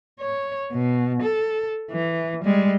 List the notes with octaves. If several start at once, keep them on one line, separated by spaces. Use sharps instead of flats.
C#5
B2
A4
E3
G3 G#3